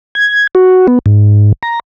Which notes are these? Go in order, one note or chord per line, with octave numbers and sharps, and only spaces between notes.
G#6
F#4
B3
G#2
A#5